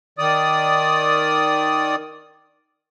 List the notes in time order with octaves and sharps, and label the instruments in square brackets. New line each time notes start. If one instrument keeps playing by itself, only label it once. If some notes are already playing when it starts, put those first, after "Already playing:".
[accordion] D#3 D5 D#6